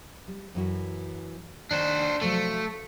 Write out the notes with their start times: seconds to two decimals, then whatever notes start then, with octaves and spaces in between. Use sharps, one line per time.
0.28 G3
0.55 F#2 E3 F#4
1.71 D#3 D4 C5
2.21 C3 F3 F#3 A3